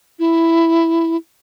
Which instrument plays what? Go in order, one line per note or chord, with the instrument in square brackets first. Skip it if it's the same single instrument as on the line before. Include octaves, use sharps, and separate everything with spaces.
[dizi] E4